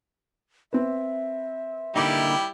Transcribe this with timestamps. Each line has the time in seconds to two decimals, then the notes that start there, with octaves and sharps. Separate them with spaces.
0.73 C4 B4 E5
1.96 D3 G3 A#3 D#4 E4 G4